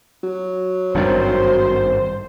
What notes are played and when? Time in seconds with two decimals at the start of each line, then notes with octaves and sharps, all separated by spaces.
0.23 F#3
0.95 G#1 G2 D#3 C5